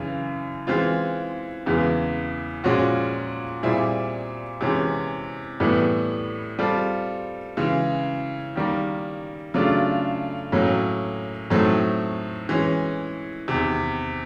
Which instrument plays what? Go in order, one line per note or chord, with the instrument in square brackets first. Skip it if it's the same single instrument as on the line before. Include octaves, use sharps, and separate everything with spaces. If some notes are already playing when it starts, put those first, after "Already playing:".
Already playing: [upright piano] F#2 C#3 E3
E3 G#3 C4 F4
E2 C#3 E3 G#3 B3
A#2 F3 G#3 C#4 F#4
A#2 G3 C4 E4 G#4
C3 E3 G#3 C#4
A2 E3 G3 B3 E4
G3 C4 F4 A4
C#3 E3 G#3
D#3 G3 A#3
C#3 F#3 A3 D4 F4
A2 F#3 A#3 C#4
A2 F#3 A3 C4 D#4
E3 G#3 C#4
E2 C3 D#3